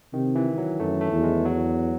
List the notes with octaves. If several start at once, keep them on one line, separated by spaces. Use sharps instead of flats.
C3 D#3
E3
F#3
F#2 A3
A3
E2
G#3
F#3